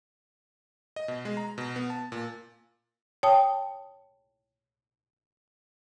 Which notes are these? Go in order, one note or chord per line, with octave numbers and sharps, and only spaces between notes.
D#5
B2
G#3
A#5
B2
B3
A5
A#2
C#5 G5 A5 D#6